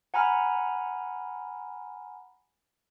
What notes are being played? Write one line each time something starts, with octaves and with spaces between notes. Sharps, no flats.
F#5 G#5 A#5 B5 F6